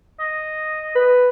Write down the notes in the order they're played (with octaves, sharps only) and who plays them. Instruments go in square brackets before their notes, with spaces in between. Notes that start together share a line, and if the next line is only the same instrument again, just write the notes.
[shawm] D#5
[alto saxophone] B4